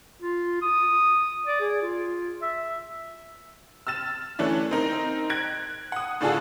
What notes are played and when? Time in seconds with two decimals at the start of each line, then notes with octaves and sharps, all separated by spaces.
0.22 F4
0.62 D#6
1.47 D5
1.61 G#4
1.82 F4
2.42 E5
3.87 E6 F6 A6 E7
4.39 E3 A3 C#4 D4 E4
4.71 C4 D#4 A#4
5.30 F#6 G#6 D7
5.92 F#5 D#6
6.21 A2 D3 D4 F4 G#4 A4